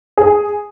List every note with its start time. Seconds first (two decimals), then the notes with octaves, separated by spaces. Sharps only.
0.17 G#4